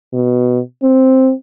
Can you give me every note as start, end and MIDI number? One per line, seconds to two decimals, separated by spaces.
0.13 0.60 47
0.83 1.32 60